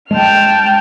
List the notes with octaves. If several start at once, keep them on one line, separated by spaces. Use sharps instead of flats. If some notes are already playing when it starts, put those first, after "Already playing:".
G#3 G5 A5 F6